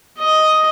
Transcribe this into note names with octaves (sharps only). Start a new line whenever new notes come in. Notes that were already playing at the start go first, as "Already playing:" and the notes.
D#5